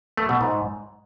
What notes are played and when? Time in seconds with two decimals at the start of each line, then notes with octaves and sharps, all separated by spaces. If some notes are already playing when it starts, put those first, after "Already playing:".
0.17 A3
0.29 B2
0.41 G#2